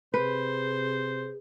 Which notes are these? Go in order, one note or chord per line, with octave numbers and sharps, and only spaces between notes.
C3 G#4 B4 C5